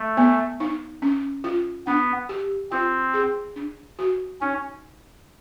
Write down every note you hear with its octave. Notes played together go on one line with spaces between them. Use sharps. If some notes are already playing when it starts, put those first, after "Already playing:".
Already playing: A3
B3
D#4
C#4
F4
B3 D4
G4
C4 F4
G#4
D4
F#4
C#4 D#4